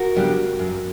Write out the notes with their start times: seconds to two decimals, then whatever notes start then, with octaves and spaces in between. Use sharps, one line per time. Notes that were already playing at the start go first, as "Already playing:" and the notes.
Already playing: F#4 A#4
0.16 C#3 G3 B3 D4
0.59 F#2